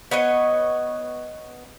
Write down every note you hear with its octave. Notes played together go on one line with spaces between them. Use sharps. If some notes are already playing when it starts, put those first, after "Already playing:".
B3 C#5 D#5